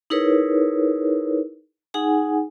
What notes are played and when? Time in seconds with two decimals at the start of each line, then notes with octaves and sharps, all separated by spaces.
0.10 D#4 E4 G#4 A#4 B4 C#5
1.94 D#4 G#4 F#5 G#5